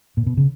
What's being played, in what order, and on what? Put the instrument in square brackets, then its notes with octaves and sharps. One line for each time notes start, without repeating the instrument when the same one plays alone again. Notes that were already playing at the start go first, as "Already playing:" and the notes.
[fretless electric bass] A#2
B2
C#3